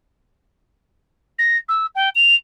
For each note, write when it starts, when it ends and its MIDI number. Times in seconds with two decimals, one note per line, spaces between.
1.39 1.57 94
1.69 1.87 88
1.95 2.09 79
2.15 2.36 101